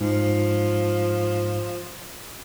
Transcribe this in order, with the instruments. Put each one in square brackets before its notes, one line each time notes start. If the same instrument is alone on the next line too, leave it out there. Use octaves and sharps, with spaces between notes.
[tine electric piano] G#2 [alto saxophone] F3